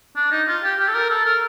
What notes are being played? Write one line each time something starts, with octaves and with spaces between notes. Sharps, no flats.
D4
D#4
F4
G4
G4
A4
A#4
A4
A#4